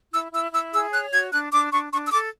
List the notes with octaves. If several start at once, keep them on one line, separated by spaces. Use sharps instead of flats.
E4 E6
E4 E6
E4 E6
G#4 E6
C#5 F#6
F#4 G#6
D4 F#6
D4 D6
D4 C#6
D4 C#6
E6
A4 D6